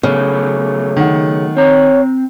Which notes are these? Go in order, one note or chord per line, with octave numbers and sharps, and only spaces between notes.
C#3 F#3 A3 B3
D#3 F#5
C4 C#5 A#5